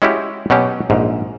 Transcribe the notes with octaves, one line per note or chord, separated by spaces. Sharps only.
G#3 C#4 E4 F#4 G4
B2 F#3 C#4 G4
A#1 G#2